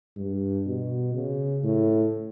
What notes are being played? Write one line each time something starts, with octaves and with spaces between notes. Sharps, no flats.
G2
B2
C#3
A2